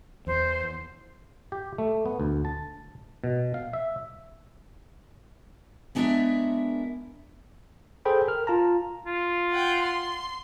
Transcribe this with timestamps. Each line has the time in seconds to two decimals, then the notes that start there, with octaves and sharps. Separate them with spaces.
0.27 E2 C5
1.52 G4
1.78 A3
2.06 B3
2.20 D2
2.45 A5
3.24 B2
3.54 F5
3.73 E5
5.95 G#3 B3 D4 E4 A#4 E5
8.05 G#4 A4 C5 G5 B5
8.28 A#4 F6
8.47 F4 A5 A#5
9.06 F4
9.50 F#5 G5
9.83 C6